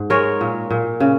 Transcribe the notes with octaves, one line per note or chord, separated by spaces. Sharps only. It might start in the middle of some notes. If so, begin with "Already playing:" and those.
Already playing: G#2
G#3 A#4 C#5
A#2
A#2
C#3